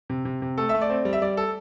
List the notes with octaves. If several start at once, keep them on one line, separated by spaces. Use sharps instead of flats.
C3
C3
C3
A3 A4
A3 E5
D5
C4
G3
E5
G3 D5
A4